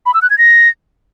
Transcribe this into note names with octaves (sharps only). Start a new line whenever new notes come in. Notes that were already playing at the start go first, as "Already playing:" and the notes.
B5
E6
F#6
G#6
A#6